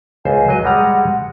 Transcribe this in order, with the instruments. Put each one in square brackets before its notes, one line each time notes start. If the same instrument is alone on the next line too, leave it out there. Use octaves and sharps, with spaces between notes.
[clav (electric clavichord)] C#2 C5 [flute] G#5
[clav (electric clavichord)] F#3 D#5
[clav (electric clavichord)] G3 G#3 A#5 [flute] F#5